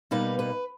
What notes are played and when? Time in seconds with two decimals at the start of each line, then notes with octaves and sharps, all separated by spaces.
0.11 B2 G3 A#3 D#4 B4
0.39 B4